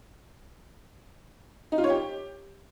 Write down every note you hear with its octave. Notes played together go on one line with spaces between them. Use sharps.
D#4
F4
C#5
G4